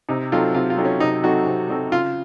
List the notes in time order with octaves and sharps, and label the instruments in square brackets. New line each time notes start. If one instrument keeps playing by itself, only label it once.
[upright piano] C3 [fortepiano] D#4
[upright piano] F#3 C4 D#4 A4 [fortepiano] F4
[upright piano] C3 [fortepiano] F4
[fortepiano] F4
[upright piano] F#3 C4 D#4 A4
[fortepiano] C#4
[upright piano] C3 [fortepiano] D#4
[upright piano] F#3 C4 D#4 A4 [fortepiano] F#4
[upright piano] C3
F#3 C4 D#4 A4
[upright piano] C#3 [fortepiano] F4